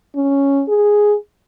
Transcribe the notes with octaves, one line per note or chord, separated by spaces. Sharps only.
C#4
G#4